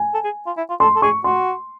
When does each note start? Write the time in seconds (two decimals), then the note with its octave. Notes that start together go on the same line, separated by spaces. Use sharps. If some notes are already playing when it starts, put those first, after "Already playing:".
Already playing: G#5
0.14 A4
0.25 G#4
0.47 F4
0.57 E4
0.70 F4
0.80 A4 C6
0.96 A4
1.02 G#4 C#6
1.24 F#4 C6